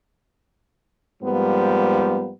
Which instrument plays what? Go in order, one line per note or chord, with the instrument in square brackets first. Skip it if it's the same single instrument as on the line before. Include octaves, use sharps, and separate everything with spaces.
[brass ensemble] G#2 F3 G3 A#3 B3